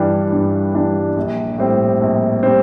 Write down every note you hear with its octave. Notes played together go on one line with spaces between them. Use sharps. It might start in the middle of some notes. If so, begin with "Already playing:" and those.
Already playing: G2 E3 G3 D4
G2
E3 G3 D4
A#1
A2 G3 C4
A#1
G3 C4